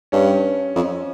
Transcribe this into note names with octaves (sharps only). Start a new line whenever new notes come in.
G2 C#4
F2